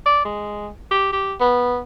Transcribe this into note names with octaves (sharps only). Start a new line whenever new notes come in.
D5
G#3
G4
G4
B3